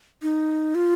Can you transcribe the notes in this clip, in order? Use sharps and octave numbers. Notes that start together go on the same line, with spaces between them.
D#4
F4